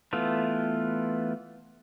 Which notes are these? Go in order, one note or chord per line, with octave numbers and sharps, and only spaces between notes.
E3 A3 B3 F4